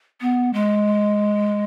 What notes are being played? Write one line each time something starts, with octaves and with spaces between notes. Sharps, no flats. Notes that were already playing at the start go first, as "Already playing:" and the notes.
B3
G#3